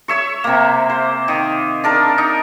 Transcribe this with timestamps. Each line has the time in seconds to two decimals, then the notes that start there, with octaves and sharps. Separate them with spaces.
0.08 C#5 E5 C#6
0.44 C3 A#3
0.90 C5
1.28 D#3
1.84 D4 A#4 A5
2.18 D#4